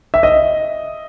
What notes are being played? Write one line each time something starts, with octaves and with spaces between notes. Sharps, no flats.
E5
D#5